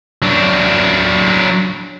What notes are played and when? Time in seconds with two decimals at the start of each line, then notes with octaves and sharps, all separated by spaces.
0.22 F#3 D4